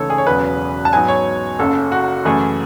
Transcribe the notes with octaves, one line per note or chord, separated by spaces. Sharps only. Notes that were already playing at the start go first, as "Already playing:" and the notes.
Already playing: C#2 C#3 E3 A3 D#4 A4 C#5
G#4
C#5
E1 E2 C#3 F#3 C#4 B4
A5
G#2 F#3 B3 D#4 G#5
C#5
F#1 F#2 C#3 A4
F#4
F#2 E3 A3 G#4